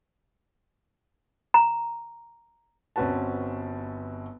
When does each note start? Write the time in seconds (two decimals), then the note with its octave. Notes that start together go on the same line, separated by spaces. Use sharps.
1.54 A#5
2.96 G1 C4 C#4 F#4 B4 A5